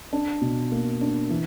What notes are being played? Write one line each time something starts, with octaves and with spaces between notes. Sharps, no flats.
D4
B2
A#3
D4
E3